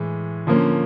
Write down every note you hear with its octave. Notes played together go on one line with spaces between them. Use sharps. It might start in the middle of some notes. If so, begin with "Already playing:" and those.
Already playing: A2 E3 G#3
D3 F3 A#3 C#4